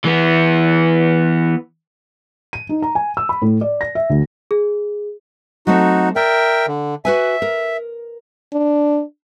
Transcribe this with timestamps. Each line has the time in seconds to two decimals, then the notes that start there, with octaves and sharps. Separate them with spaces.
0.05 E3 B3
2.53 D#7
2.69 D#4
2.82 A#5
2.95 G#5
3.17 E6
3.29 B5
3.42 A2
3.61 D5
3.81 A#6
3.95 E5
4.10 D2
4.51 G#4
5.67 F#3 A3 C4 D#4 F#4
6.16 A#4 D5 E5 G5
6.68 D3
7.05 F#4 B4 E5 G#5
7.42 A#4
8.52 D4